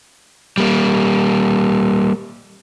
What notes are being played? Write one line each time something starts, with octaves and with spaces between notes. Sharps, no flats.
G3 A#3